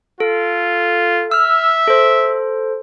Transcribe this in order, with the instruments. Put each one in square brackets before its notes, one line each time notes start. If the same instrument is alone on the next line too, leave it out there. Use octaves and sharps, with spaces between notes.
[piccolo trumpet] F4 [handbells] A4
[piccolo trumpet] E5 [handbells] E6 F6
[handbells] A4 C5